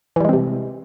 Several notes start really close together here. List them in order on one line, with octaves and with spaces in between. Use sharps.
E3 G3 G#3 C4 C3